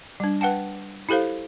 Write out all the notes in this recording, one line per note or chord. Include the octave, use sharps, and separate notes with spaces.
G3 D4
B4 F#5 G5 A5
E4 G4 A4 C5 F5